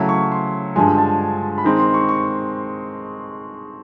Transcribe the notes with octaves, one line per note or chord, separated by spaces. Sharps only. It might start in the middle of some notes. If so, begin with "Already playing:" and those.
Already playing: C#3 F#3 A3 C#4 E4
C#6
C6
G2 D3 F3 G#3 G#5
A5
B5
D#3 G#3 C4 D#4 A#5
C6
C#6
C#6